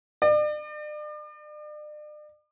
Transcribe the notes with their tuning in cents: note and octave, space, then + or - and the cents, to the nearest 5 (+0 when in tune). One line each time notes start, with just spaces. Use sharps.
D5 +40